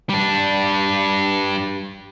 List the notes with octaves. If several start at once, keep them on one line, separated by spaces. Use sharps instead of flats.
G3 D4